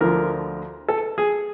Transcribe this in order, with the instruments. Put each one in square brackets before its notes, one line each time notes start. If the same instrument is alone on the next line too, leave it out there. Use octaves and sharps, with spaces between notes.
[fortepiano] D2 D3 F3 A#4
A4
G#4